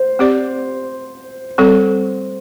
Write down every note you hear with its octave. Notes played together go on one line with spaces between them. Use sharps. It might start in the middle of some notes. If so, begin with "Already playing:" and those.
Already playing: C5
C4 G4 D5
G3 C4 A4